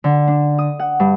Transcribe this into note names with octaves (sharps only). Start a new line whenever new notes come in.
D3
D4
D#6
F#5
G2